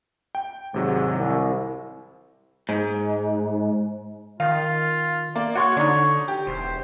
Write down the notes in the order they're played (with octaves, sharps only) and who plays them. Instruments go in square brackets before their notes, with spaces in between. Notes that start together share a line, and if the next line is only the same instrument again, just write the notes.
[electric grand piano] G5
[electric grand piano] G#1 C3 F#3 [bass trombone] G#2
[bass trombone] C2
[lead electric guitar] G#2
[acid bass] D#3 [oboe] F4 [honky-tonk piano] F5
[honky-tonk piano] A#3 [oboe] D5
[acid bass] F#4 [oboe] C#5 [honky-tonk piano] F#5 C6 C#6
[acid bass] D3 [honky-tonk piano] D4 D#4
[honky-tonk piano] G4
[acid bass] E1 [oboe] C5